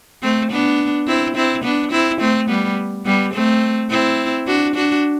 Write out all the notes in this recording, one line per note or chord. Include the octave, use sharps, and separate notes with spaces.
A3 C4
B3 D4
C4 E4
C4 E4
B3 D4
C4 E4
A3 C4
G3 B3
G3 B3
A3 C4
C4 E4
D4 F#4
D4 F#4